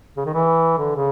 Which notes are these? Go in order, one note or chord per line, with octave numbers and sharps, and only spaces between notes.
C#3
D#3
E3
D3
C#3